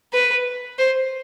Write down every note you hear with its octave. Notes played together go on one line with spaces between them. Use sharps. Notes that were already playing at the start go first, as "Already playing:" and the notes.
B4
C5